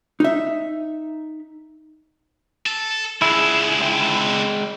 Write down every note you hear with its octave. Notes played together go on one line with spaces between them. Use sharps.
D#4 E5
A4
C#2 D3 E4 G#4
G#3 G5